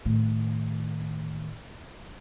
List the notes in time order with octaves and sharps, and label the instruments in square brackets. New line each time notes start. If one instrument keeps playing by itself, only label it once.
[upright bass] A2 D#3